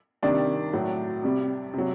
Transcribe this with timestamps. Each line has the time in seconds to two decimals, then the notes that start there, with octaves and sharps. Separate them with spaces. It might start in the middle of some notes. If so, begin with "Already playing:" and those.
0.23 C3 D#3 G3 D4 D5
0.73 A2 F#3
1.24 C3 G3
1.74 C3 F#3